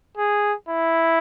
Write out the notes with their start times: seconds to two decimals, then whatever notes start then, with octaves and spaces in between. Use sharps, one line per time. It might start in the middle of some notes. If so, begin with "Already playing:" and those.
0.17 G#4
0.69 E4